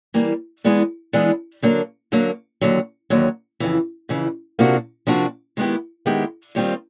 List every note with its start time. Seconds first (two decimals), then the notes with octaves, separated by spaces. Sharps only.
0.14 E3 G3 A#3
0.64 E3 G#3 B3 D4
1.13 E3 G#3 B3 D4
1.62 D3 F#3 A#3 D4
2.12 D3 F#3 A#3 D4
2.61 D#2 D3 F#3
3.10 D#2 D3 F#3
3.60 F2 C#3 E3
4.09 F2 C#3 E3
4.59 C3 F3 A#3 D4 F#4
5.07 C3 F3 A#3 D4 F#4
5.57 D#3 G#3 B3 E4 G4
6.06 D#3 G#3 B3 E4 G4
6.55 D#2 D#3 G3 C4 F4